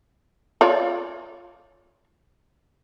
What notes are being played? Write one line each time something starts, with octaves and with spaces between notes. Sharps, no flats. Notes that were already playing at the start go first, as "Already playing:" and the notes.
F4 C#5 D5